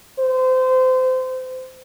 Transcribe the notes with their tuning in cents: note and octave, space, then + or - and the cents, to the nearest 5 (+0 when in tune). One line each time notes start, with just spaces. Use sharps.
C5 -25